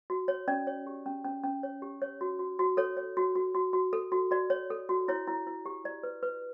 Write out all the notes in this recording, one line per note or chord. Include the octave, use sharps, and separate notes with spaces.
F#4
C#5
C#4 D5
C#5
G4
C#4
C#4
C#4
C#5
G4
C#5
F#4
F#4
F#4
A4 C#5
C#5
F#4
F#4
F#4
F#4
A4
F#4
F#4 D5
C#5
A4
F#4
E4 C#5
E4
E4
G4
E4 D5
B4
B4